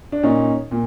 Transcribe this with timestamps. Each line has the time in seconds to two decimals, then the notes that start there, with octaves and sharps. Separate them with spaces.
0.12 D4
0.23 A#2 C#4 D#4
0.71 A#2